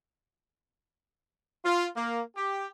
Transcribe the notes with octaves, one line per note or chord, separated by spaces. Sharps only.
F4
A#3
G4